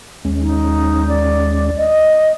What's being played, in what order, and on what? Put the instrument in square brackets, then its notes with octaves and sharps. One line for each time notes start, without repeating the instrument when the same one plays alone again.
[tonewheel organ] D#2 G#3 C#4
[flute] D#4
D5
D#5